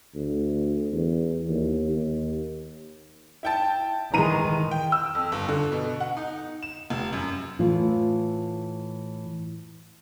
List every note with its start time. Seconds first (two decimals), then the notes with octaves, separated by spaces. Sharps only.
0.15 D2
0.93 E2
1.49 D#2
1.91 D#2
3.43 E4 G5 A5
4.14 D#3 E3 G#3 A#5 D#7
4.71 G5
4.92 E6
5.15 F2
5.32 G1
5.49 D3
5.72 B2
6.00 F#5
6.17 D#4
6.63 E7
6.90 F1
7.13 F#2
7.59 A2 E3 F4